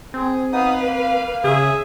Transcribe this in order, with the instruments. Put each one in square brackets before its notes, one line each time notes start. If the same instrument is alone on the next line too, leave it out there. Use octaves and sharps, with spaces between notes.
[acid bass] C4 [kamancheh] G#4
[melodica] B3 D#4 D#6 [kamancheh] B4 F5
[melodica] A#3
[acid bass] C#3 [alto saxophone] G#4 [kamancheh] E5